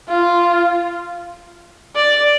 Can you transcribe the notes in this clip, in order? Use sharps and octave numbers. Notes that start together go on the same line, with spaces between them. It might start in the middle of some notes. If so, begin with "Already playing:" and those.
F4
D5